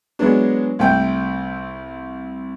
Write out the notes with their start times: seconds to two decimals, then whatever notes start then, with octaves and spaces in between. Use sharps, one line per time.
0.19 F#3 G#3 B3 D4
0.79 C2 A3 G5